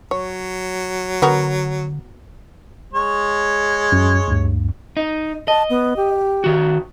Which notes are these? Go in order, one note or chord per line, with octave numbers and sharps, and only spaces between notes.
F#3 C#5
D3 B3 F#4 A#4
G#3 C#5
F#2
D2 G2
D#4
D#5 A5
B3
G4
D#3 F#4